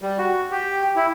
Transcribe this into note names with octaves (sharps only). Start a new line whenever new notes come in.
G3
F#4
G4
E4